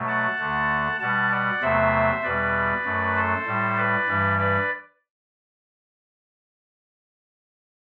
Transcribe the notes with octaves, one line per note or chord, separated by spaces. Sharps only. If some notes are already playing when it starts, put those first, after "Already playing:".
Already playing: B2 F#3 A3
F#5 A5
D2 D3 A3
B2 G3 F#5 A5
D5 F#5
E2 C3 F#3 A3 C5 E5
E2 B2 G3 B4 D5
F#2 F#3 A3
A4 C5
A2 G3
B4 D5
G2 E3 G3
B4 D5